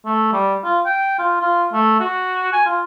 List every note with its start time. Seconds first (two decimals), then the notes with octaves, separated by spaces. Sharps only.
0.06 A3
0.33 G3
0.64 F4
0.86 G5
1.19 F4
1.41 F4
1.73 A3
2.00 F#4
2.53 G#5
2.66 F4